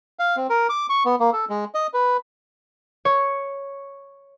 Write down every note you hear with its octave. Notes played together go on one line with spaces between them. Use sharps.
F5
C4
A#4
D6
C#6
B3
A#3
A4
G#3
D#5
B4
C#5